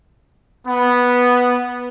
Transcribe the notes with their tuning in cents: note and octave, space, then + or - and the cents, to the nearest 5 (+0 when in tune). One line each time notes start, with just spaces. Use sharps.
B3 -5